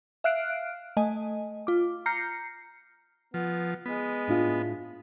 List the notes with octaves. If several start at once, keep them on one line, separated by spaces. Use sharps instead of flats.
E5 F5 F6 F#6 C7 D7
A3 D#5 G#5
F4 D6
A#5 F6 G6 A#6 C7 C#7
F3 B3
G#3 B3
A2 D4 F4